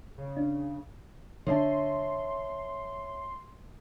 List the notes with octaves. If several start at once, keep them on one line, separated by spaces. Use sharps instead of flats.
C#3
D4
D3 D4 C#5 E5 A5 C6